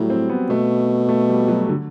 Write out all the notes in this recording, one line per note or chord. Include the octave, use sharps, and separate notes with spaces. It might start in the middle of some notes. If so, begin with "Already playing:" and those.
Already playing: A2 F#3 G3
C4
B3
B2 A3
A3
G3
F#3
D3